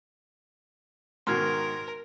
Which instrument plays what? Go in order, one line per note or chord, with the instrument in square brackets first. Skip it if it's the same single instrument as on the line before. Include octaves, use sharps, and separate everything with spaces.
[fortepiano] G#2 B2 D#3 [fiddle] A#4 [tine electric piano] C6 F6 G#6